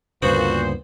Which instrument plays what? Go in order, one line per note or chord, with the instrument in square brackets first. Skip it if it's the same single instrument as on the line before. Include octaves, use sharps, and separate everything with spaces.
[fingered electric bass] D2 G2 C#3 [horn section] A#2 C5 [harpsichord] B3 F#5 [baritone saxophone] F#4